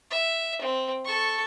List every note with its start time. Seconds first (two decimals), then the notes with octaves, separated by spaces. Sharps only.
0.11 E5
0.62 C4
1.05 A4 C#6